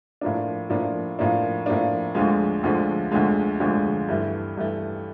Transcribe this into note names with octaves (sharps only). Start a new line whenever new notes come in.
A2 F3 A#3 D4
A2 F3 A#3 D4
A2 F3 A#3 D4
A2 F3 A#3 D4
D2 D3 F3 G#3
D2 D3 F3 G#3
D2 D3 F3 G#3
D2 D3 F3 G#3
G2 E3 A3
G2 E3 A3